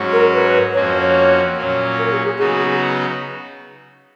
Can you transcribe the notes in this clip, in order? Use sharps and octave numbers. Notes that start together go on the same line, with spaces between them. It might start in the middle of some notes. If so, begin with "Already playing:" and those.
Already playing: G#2 F#3 C#4 F#4
A#4
B4
F2 F3 A#3 C#4 F#4 C#5
C#5
C#5
A#2 F#3 C#4
A#4
G#4
G#4
C#3 F#3 B3 D#4 F#4 G#4